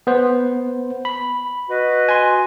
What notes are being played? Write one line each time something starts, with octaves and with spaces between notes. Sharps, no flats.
B3 C5
B5
F#4 B4 D#5
G#5 C6